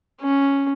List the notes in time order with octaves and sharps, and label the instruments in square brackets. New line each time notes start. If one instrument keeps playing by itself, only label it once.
[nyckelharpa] C#4